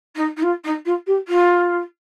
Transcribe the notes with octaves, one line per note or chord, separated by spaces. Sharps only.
D#4
D#4
F4
D#4
F4
G4
F4